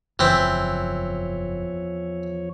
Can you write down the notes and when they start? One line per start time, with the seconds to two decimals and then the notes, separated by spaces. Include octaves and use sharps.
0.19 F#1 E2 E3 F3 C4 C#5